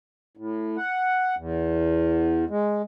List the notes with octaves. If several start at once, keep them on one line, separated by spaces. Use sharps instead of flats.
A2
F#5
E2
G#3